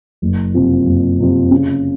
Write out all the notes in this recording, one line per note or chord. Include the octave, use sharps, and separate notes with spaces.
F#1
F2 C3 F3 C4
F#1
F2 C3 F3 C4
C#3